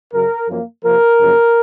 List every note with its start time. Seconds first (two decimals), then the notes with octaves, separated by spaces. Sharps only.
0.13 F#2 C#3 F#3 A#4
0.49 F#2 F3 A#3
0.84 C3 F3 A#3 A#4
1.20 F#2 C#3 F3 A#3